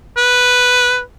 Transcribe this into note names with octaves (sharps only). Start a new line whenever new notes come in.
B4